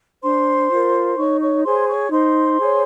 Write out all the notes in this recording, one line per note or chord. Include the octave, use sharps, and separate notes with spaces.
D4 C5 C6
F4 A#4
D#4 C#5 C#6
C#5 C#6
G#4 C5 C#5 C6
C#5 C#6
D#4 C5 C6
G#4 C#5